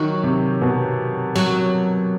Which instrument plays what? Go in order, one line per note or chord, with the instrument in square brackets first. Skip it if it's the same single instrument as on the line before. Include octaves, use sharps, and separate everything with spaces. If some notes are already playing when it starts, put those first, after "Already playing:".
Already playing: [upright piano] D#3 [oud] F#3
[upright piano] C3
B2
[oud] F#3